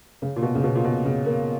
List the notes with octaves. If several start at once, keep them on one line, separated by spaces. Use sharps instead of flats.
C#3
A#2
B2
C#3
B2
A#2
B2
C#3
A#3